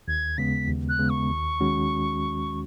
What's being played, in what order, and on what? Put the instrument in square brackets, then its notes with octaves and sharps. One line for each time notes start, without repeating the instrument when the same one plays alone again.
[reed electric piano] D#2 [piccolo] G#6
[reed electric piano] C#3 G#3 B3 [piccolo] B6
[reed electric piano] D#2
[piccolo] F#6
[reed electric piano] C#3 G#3 B3
[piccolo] C#6
[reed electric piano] D#2
D#3 G#3 C#4 F#4